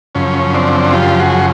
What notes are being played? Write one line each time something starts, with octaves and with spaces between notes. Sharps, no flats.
F#2 C#3 F3 C#4
C4 D4
F4 G4
F#4 G#4